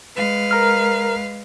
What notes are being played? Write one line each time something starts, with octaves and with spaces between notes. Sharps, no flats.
G#3 B4 F5
A#4 A#5 F6